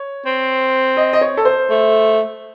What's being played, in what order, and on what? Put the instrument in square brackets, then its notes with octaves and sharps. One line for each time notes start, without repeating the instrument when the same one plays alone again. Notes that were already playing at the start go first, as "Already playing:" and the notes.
Already playing: [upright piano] C#5
[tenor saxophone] C4
[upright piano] D#5
D#5
C#5
A4
C5
[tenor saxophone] A3